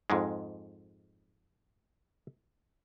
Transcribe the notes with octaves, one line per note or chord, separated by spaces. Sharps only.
F2 G#2 G#3